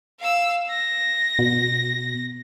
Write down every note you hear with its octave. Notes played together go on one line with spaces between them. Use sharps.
F5 E6
A#6
B2